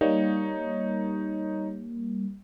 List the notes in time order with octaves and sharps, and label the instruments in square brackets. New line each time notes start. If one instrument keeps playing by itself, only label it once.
[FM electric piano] G3 A#3 [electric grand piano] D#4 C#5